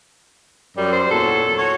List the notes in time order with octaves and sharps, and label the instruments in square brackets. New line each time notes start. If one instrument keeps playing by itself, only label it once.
[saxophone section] F#2 [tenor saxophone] G3
[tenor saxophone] C5
[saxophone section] E2 A#2 F#3 [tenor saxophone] A4
[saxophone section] F#4 C#5